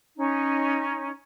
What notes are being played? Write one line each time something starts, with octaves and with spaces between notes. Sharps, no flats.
C#4 D#4